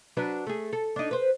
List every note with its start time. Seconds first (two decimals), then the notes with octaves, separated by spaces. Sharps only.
0.17 F#3 D4 B4
0.47 A3 G#4
0.73 A4
0.96 D4 D#4
1.11 B4 C5